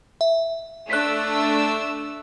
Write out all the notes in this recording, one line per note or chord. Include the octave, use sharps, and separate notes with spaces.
E5
A3 D4 E6 F#6 B6